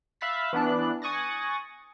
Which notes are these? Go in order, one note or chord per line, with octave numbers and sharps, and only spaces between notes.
E5 F5 B5 F#6 A6 B6
E3 B3 D4 F#6
G#5 C#6 D#6 F#6 A6 A#6